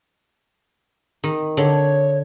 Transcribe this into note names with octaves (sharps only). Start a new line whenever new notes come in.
D#3
D3 C#5